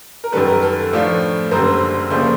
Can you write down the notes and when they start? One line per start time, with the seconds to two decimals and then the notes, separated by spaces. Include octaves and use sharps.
0.24 A#4
0.32 F#2 D#3 G3 A4 B4
0.47 A#4
0.63 A4
0.92 A2 F3 A3 D4 F4
1.51 F#1 F#2 D3 G3 A#4 C5
2.10 D#2 C#3 F3 A3 C5 D5